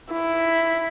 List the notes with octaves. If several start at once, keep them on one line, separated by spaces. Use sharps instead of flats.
E4